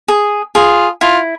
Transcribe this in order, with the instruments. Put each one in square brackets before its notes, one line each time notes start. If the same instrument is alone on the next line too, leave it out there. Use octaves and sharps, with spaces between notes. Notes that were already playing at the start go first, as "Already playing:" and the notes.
[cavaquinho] G#4
[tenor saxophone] F4 [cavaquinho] G#4
[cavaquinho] E4 [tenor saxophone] F4